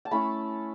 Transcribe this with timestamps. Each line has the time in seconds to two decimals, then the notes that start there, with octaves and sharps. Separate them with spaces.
0.05 A5
0.11 A3 C#4 E4 B5